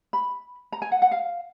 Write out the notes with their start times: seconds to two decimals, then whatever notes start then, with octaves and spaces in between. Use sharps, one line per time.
0.13 B5
0.72 A#5
0.82 G#5
0.92 F#5
1.02 F#5
1.11 F5